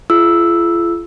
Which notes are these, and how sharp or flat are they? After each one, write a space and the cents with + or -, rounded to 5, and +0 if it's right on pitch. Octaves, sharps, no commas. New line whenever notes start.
F4 -40 G#4 +45 E6 +0